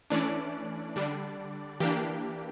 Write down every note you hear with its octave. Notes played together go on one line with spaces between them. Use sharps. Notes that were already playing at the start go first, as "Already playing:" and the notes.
E3 A3 C#4 D4 D5
D3 G3 D4
E3 A#3 D4 G4